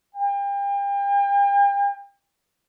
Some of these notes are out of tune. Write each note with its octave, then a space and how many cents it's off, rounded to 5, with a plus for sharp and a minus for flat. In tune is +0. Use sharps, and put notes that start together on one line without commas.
G5 +40